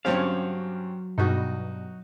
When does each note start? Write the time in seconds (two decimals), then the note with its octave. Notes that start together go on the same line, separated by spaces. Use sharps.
0.05 G2 F#3 C4 C#4 G4 C#5 F5
1.18 G2 B2 D#4 F#4